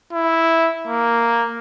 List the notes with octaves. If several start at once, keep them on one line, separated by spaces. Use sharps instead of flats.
E4
A#3